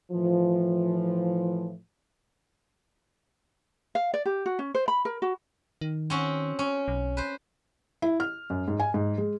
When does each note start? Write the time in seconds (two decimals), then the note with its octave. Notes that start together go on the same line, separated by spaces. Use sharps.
0.12 A2 E3 F3
3.95 F5
4.14 D5
4.25 G4
4.46 F#4
4.59 C#4
4.74 C5
4.88 B5
5.05 A#4
5.22 F#4
5.81 D#3
6.10 C4 C#4 F#4
6.59 C#4
6.88 B1
7.17 B4 C5
8.02 E4
8.20 F6
8.50 F#2
8.68 G#2
8.80 G#5
8.94 G#2
9.18 G#3